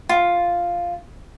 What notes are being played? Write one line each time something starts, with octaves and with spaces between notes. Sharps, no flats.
F4